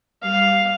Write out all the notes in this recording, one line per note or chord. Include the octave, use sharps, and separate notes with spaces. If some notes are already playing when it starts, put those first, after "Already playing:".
G3 F5